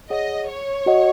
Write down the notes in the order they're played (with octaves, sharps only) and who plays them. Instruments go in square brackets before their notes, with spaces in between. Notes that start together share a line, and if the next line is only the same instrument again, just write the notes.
[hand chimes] G#4 C#5 F#5 [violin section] D#5
[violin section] C#5
[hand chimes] F#4 D#5 F#5